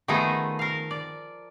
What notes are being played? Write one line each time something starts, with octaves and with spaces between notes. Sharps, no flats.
D#3 F3 A3 B3 D#4 G#4
A#4 F5
D5